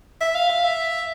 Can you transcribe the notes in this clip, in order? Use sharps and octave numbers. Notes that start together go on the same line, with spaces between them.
E5
F5
F5
E5